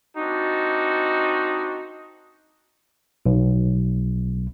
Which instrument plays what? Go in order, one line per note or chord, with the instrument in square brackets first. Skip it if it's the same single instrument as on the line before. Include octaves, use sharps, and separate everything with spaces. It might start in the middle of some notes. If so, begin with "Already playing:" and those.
[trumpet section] C4 D4 D#4 F#4
[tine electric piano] B1